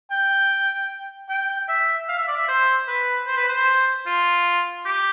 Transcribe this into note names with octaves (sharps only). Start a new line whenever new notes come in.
G5
G5
E5
F5
E5
D5
E5
C5
B4
C5
B4
C5
F4
G4